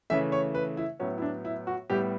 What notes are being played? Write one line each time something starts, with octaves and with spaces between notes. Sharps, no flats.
C#3 E3 A3 E5
C#5
B4
E4
A2 F#3 B3 C#4
E4
D4
E4
F#4
A2 G3 B3 G4